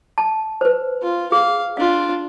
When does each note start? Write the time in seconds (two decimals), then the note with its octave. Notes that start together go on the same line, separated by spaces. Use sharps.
0.18 A5
0.61 B4 C5
1.02 F4
1.32 G#4 F5
1.77 D4 F4 F5